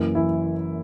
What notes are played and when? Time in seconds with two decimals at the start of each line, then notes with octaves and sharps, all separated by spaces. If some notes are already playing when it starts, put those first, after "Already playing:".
Already playing: F#1 F#2 E3
0.15 E3 E4